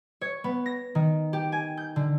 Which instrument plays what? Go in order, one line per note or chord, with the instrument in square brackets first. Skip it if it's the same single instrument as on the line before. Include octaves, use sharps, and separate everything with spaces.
[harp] C#5
B3
A#6
D#3
G4
G#5
G6
D3